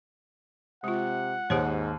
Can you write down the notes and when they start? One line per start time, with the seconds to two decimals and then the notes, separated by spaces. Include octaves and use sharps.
0.84 C3 G#3 F4 F#5
1.50 D#2 G#2 G4 C5 C#5